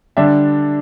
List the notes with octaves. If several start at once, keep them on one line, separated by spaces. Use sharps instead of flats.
D3 G3 D4 E5